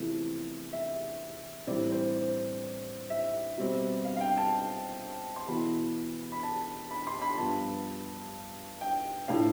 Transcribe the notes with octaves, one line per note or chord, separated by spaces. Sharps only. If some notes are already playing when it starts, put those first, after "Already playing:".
Already playing: E2 C3 F3 A3 E4
E5
A2 E3 G3 C4 D5
C5
C5
E5
B2 G3 C4
F5
F5
G5
A5
C6
E2 B2 B3 E4 B5
B5
A5
B5
C6
B5
G2 F3 B3 A5
G5
A2 F3 A3 D4 F5